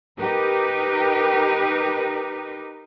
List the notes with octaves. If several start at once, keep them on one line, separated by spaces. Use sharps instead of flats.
D#4 G4 A#4 B4